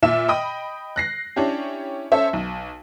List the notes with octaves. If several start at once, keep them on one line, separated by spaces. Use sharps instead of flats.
A#2 E5 E7
D#5 G5 B5 D#6
F#6 A#6 C7
C#4 D4 E4 G4
C#4 A4 C5 E5
B1